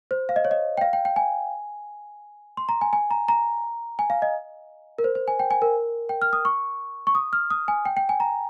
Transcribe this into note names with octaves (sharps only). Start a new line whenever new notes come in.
C5
F5
D#5
C#5
D#5
G5
F5
G5
G5
G#5
C6
A#5
G#5
G#5
A#5
A#5
G#5
F5
D#5
A#4
C5
C5
G#5
G5
G#5
A#4
G5
F6
D#6
C#6
C#6
D#6
F6
D#6
G#5
G5
G5
G#5
A#5